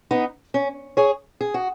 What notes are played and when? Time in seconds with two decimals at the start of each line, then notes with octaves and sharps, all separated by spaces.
0.11 B3 D#4
0.54 C#4
0.97 G#4 C#5
1.41 G#4
1.54 F#4